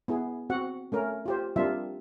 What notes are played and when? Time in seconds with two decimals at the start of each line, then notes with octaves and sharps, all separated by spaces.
0.08 B3 E4 G#4
0.50 C4 F#4 F#5
0.92 A3 C#4 A#4
1.26 F4 G4 C5
1.56 G3 A#3 C4 D4 F4 E5